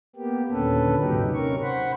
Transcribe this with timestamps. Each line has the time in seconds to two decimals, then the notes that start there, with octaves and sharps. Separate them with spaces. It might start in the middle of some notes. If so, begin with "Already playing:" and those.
0.16 A#3 B3 G4
0.51 D#2 A#2 D3 C#4 A4 B4
0.98 G#2 C3 F#3 D#4 G4
1.34 C3 C#4 A#4 C#6
1.62 C5 F#5 B5